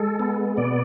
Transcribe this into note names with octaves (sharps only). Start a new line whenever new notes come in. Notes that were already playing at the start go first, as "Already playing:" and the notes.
Already playing: G#3 A4
B3
B2 D5